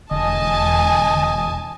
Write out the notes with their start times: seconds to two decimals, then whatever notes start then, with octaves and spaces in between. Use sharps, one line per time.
0.11 E1 D3 D#5 G#5 A5